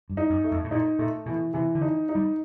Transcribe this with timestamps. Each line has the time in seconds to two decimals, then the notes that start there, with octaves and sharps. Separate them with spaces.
0.10 G2
0.17 D#4
0.30 F#2
0.44 A3
0.51 F2
0.64 A2
0.71 A#2 D#4
0.99 A#2 A3
1.26 B2 E3
1.54 C3 E3
1.75 D3
1.81 D#4
2.09 D#4
2.15 G3